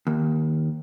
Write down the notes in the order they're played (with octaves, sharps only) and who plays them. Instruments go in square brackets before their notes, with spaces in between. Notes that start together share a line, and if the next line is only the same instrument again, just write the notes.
[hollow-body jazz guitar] D#2